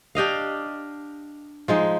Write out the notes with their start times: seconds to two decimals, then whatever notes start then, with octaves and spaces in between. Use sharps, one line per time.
0.15 D4 G4 D#5 F5
1.68 F3 G#3 D#4